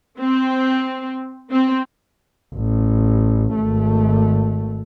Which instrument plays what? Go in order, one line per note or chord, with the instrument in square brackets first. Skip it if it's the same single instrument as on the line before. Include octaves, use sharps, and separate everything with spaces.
[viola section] C4
C4
[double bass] A1
G#1 A3